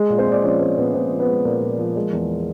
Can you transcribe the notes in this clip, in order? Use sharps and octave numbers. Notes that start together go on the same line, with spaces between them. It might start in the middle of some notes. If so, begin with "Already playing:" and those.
Already playing: G#3 G#4
A#2
C4 C5
A#2
D5
F3 C#4 C#5
G#3 C4 C5
A#2 B3 B4
A#2 C4 C5
F3
B3 B4
G#3
A#2 A#3 A#4
A#2
F3
G#3
E2